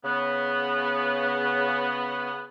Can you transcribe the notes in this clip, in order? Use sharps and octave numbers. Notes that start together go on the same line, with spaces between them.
C#3 B3